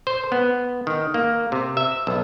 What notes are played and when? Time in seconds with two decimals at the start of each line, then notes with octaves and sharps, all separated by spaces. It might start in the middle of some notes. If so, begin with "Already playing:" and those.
0.07 C5
0.32 B3
0.87 D#3
1.14 A#3
1.52 C3
1.77 E5
2.07 B1